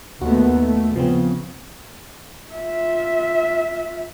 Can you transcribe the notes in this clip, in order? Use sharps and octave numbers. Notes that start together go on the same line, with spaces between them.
D#2 A3 B3 F#4
A3
C#3 F3 B3 C4
F4 E5